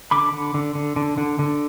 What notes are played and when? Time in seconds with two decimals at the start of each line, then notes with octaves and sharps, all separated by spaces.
0.11 D3 B5 D6
0.33 D3
0.54 D3
0.75 D3
0.96 D3
1.18 D3
1.39 D3